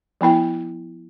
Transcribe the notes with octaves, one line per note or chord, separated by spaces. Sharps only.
F3 B3 E4 G5